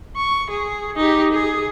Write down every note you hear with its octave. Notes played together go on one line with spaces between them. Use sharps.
C#6
G#4
D#4 G4
G#4